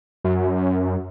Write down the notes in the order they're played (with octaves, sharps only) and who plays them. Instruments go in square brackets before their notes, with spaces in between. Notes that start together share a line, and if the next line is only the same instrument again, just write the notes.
[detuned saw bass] F#2